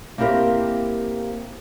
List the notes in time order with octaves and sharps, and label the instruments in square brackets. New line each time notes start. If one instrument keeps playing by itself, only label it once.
[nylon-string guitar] A#3 C4 E4 G4 A#4 C5